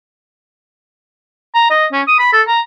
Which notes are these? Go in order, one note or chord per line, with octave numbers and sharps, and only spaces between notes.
A#5
D#5
C#4
D#6
B5
A4
A#5